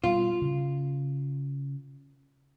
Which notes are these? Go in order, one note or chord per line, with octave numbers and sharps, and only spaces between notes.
B2 G3 F4
C#3